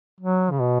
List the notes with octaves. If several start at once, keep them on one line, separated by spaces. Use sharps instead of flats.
F#3
C#3
B2